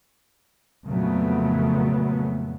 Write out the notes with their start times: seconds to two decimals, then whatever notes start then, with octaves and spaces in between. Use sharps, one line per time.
0.87 F2 A#2 C#3 F#3 A3 B3